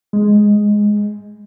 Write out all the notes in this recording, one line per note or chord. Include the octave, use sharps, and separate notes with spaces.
G#3